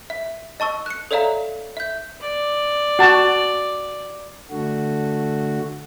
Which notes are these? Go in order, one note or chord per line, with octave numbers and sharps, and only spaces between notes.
E5
D#5 A5 C#6 E6
F#6 C#7
A4 C#5 D5 E5 F5 A#5
E5 G6
D5
F#4 A5
D3 A3 F#4